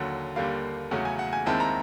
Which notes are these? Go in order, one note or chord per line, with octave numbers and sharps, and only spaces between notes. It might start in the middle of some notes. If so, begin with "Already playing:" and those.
Already playing: D#2 D3 F#3 F#5
D#2 D3 G3 A#3 F5
E2 C#3 F#3 A3 C#4 F#5
G#5
F#5
G#5
D#2 D#3 G#3 C4 E4 A5
A#5